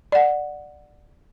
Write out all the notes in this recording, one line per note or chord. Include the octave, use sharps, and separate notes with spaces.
D5 F#5